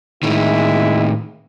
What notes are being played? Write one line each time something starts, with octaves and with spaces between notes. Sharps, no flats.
A2 D#3 G#3 E4